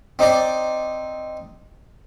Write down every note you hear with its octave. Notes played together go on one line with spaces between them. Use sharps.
C4 D#4 C5 D5 C6